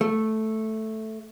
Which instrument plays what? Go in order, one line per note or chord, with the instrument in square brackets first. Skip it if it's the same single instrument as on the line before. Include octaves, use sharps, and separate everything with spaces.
[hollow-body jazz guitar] A3